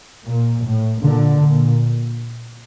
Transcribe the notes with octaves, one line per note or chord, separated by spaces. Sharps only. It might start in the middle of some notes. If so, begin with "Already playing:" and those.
A#2
A2
A#2 D3
A#2